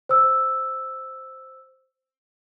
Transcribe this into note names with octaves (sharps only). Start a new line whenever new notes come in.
C5 E6